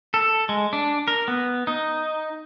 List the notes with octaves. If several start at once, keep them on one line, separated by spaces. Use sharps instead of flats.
A4
G#3
D4
A#4
B3
D#4